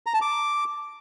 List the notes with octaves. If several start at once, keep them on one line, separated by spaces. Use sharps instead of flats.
A#5
A5
D6